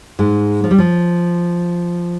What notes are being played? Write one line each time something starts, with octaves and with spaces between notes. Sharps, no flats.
G#2 G#3
F3
G3
F3